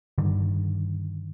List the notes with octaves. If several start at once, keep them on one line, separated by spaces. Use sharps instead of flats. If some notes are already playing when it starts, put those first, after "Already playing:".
G2 D3 D#3